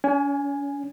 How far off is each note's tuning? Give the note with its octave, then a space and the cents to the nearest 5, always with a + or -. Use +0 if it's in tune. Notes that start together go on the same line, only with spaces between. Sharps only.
C#4 +40 G#5 +0